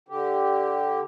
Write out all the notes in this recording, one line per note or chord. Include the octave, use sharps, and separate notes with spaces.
D3 G4